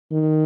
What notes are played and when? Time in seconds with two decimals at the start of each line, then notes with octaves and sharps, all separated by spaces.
0.12 D#3